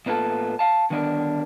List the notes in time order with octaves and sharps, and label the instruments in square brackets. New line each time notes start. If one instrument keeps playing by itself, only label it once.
[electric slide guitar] A2 A#3 B3 F4 A4
F5 A5
D3 D#3 G3 B3 D4 A#4